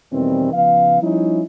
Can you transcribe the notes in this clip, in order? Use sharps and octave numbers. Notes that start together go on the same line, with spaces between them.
E2 B2 D#3 E3 G3 C4
C#3 F3 B3 F5
F3 G3 C#4 D#4 E4